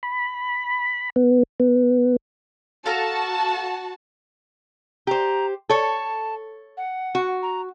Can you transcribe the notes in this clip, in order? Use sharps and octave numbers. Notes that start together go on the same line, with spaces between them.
B5
B3
B3
F#4 A4 F5 A5 A#5
G4 C5 A#5
A4 C#5 A5
F#5
F#4
A#5